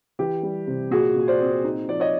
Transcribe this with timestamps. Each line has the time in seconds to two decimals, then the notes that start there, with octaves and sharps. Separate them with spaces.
0.19 E3 G4
0.43 G3
0.67 C3
0.91 A#2 F#4 G#4
1.16 A#2
1.28 C5 D5
1.40 C4
1.64 D#4
1.88 F3 D5
2.00 C#5 D#5